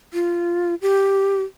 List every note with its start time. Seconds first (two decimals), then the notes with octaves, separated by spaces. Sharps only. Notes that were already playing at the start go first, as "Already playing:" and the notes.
0.13 F4
0.82 G4